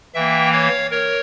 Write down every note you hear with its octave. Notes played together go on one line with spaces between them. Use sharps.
E3 A#3 E5 G5
C#5 F5
A#4 C#5